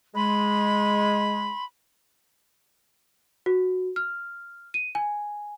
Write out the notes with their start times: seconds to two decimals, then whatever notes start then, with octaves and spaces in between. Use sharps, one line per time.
0.14 G#3 B5 C6
3.46 F#4
3.96 F6
4.74 D#7
4.95 G#5